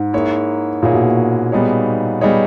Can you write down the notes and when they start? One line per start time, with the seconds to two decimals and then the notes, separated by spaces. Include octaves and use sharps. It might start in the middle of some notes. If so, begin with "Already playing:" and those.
Already playing: G#2
0.13 A#3 E4 G#4 C#5
0.83 A#2 A#3 E4 G#4 C#5
0.93 B2
1.04 A#2
1.52 G3 B3 D#4 G#4 C#5
2.21 G3 B3 D#4 G#4 C#5